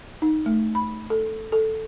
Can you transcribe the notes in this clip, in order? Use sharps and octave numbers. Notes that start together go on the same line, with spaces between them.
D#4
A3
B5
A4
A4